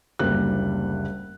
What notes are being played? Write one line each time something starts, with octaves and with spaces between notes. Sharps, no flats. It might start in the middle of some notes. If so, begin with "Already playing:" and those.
F#1 D2 G3 A#3 F#6